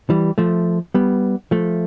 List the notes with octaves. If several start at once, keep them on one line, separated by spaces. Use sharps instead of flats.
E3 G3
F3 A3
G3 B3
F3 A3